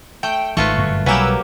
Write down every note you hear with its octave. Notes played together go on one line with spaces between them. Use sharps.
A3 G5
G#1 D#3 A3 F4 B4 C#6
G1 F#2 A#2
B1 F#3 G3 A#3 G4 B4 G#5 E6